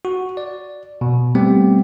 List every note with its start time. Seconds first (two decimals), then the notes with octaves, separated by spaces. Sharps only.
0.05 F#4
0.37 D5
1.01 B2
1.35 G3 A3 B3 C4 G4